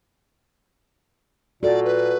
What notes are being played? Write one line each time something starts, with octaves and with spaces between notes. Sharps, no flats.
A#2 F#4 A4 D5
B4